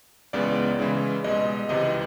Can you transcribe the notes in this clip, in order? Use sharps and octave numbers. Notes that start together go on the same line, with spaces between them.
C#2 C#3 E3 G#3 B3 D5
C#3 E3 G#3 C#4 E4
C2 B2 G#3 D#5
C#2 C3 E3 D#5